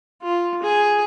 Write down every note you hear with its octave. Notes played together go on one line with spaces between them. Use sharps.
F4
G#4